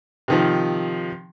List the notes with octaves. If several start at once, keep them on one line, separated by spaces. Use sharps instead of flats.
C3 D#3 F3